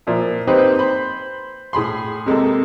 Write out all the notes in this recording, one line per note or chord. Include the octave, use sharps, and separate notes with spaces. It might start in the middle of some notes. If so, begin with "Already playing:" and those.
A#2 F3 E4
A#3 C4 D#4 G4 B4 C5
C5 B5
A2 G#4 B5 C6
C3 G#3 A#3 A4